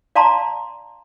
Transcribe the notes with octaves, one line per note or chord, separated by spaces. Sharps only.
D5 F5 A5 A#5 C6